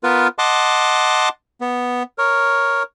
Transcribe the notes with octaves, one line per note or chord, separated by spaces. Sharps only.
B3 F4 A#4 B4
D#5 F#5 A5 C6 D6
B3
A#4 C#5